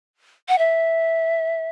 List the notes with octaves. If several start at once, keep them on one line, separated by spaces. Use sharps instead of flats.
F#5
E5